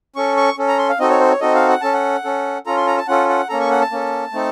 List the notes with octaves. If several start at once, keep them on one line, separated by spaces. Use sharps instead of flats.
C#4 A4 C#6
C#6
C#4 A4
A#5
C6
F5
C4 D#4 F#4 A4 D#5
C#5
C5
C#5
C4 D#4 F#4 A4 D#5
F5
F#5
C#4 A4 A5
F#5
C#4 A4
C#4 F4 A4 A#5
C6
A#5
A5
C#4 F4 A4 F#5
F#5
A#3 C#4 A4 A#5
C#6
F#5
A5
A#3 C#4 A4
A3 C4 D#4 A4